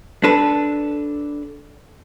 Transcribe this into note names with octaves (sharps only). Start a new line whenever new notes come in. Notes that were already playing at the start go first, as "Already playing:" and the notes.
D4 A4 B4